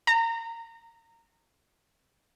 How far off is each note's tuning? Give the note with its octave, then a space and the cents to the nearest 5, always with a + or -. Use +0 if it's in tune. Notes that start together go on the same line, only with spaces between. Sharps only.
A#5 -25